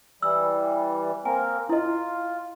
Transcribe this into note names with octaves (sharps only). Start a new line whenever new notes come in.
E3 G3 E6
A#3 C4 A#4 G#5
E4 F4 D#5